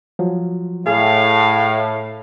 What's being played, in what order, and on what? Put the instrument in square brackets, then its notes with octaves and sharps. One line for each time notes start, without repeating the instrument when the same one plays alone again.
[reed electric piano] F3 F#3
[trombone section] A2 [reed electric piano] G#4 [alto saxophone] F5